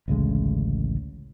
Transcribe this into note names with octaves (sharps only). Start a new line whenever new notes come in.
A1 D2 C#3 G#3